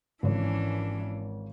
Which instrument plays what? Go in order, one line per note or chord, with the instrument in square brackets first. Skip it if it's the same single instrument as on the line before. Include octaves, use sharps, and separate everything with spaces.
[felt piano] G#1 C#5 [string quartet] E3 C#4 D4